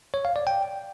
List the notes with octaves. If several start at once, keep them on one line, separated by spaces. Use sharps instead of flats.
C#5
F5
D5
G5